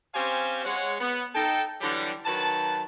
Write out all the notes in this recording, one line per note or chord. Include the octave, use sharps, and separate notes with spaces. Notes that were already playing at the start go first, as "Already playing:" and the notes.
C4 C#4 G4 C5 F5 G#5
G#3 C#5 F#5
B3
D#4 A4 G5
D3 E3 F#3 G3
D#3 F#3 B4 A5